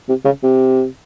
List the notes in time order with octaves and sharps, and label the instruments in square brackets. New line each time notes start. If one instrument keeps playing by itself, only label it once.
[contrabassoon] C3
C#3
C3